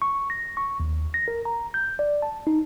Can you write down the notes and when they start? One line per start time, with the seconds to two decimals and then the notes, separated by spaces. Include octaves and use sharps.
0.02 C#6
0.30 A#6
0.57 C#6
0.80 D#2
1.14 A#6
1.28 A#4
1.45 A#5
1.74 G6
1.99 D5
2.22 A5
2.47 D#4